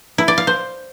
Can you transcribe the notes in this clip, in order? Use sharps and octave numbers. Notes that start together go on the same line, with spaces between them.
E4
D5
F5
C5